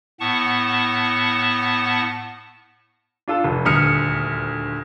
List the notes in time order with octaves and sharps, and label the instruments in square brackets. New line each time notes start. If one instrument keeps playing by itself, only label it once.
[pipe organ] A2 B3 F#5 A5 C#6
[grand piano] D4 F4 A4
F1
D#1 D2 D#6 F6 C#7